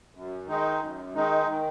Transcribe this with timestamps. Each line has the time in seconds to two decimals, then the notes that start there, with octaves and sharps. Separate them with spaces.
0.15 F#2
0.47 D#3 G#3 D#4
0.81 F#2
1.14 D#3 G#3 D#4
1.47 D#3